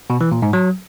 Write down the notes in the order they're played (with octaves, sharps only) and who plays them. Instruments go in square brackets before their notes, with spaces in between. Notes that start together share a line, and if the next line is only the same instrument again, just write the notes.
[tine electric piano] B2
E3
A#2
G#2
F#3